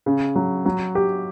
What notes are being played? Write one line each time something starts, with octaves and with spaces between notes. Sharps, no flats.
C#3
F#3
F#3
G4